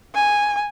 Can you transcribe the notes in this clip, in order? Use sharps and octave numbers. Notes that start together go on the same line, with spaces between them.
G#5